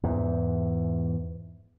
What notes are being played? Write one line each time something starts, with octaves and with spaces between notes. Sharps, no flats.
E2 G#2 E3